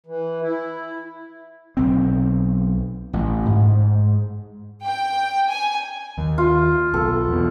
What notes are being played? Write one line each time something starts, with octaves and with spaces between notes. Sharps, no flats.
E3
E4
B1 C4
A1
G#2
G5
G#5
D#2
F4
B1 A4
E2 B2